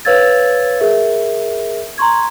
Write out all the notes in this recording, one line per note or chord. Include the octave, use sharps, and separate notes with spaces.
B4 C#5 F5 E6 G#6 A6
G#4 A#4 E5
A#5 C6 C#6 G#6